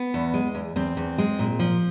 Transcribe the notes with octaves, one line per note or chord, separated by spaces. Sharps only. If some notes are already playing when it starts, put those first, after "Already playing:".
Already playing: B3
E2
G#3
E2
E2 C4
E2
G#3
A#2
F3